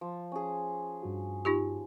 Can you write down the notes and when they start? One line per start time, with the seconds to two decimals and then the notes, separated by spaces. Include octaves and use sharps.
0.01 F3
0.32 C#4 G#4
1.03 G2 F#4
1.45 D#4 F4 G4